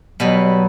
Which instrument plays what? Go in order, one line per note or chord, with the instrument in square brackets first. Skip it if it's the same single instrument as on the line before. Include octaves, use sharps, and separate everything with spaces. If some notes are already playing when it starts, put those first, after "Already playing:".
[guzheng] B2 G3 B3 [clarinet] F#3